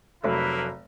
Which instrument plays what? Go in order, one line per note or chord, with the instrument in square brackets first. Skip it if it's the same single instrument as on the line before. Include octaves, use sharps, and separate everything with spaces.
[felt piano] F1 F#3 A4 [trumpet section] A#3 E4 B4